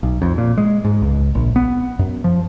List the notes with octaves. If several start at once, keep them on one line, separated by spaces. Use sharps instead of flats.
B1
F2
A#2
G#3
G#2
C#2
A#1
B3
F#2
F3